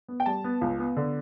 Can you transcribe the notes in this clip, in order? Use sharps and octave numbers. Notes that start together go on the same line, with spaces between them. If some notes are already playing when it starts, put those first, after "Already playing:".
B3
G5
G3 A5
B3
C#2
B3
D3